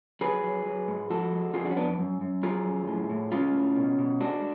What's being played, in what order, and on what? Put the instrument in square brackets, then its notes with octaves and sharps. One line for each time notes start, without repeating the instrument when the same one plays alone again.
[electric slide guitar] F#3 G#4 B4
F#3
F#3
G#2
F3 F#4 A4
G#3
F2 F4 G#4
D4 F#4
C#4
F2 B3 D4
F#2
F#2
F#3 F4 G#4
F#2
A2
A2
G#3 C#4 F4
A2
B2
B2
G#3 D4 F#4